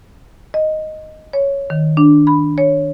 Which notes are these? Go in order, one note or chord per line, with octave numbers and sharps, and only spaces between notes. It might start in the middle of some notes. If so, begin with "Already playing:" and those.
D#5
C#5
D#3
D4
B5
C#5